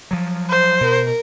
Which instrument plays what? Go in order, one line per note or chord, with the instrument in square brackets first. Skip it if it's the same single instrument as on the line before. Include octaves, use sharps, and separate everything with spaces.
[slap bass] F3 F#3
[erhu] C5
[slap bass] B2 [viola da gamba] A#4